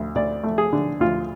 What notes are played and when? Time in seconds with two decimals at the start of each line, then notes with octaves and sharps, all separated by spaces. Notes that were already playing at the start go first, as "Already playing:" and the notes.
Already playing: D2
0.15 D2 D5
0.44 A3
0.58 G#4
0.73 D3
1.00 D2 F4